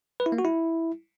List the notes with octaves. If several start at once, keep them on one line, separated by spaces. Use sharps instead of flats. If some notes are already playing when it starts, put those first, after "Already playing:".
B4
E4
A#3
F#4
E4